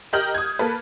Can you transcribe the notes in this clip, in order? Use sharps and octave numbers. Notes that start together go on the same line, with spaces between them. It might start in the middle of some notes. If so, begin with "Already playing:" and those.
G4 A#4 D#5 F6 G6 F#7
D#6 G#6
A#3 A4 B4